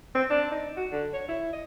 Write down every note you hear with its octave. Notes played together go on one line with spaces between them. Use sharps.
C4
D4
D#4
F#4
D3
C#5
E4
D#5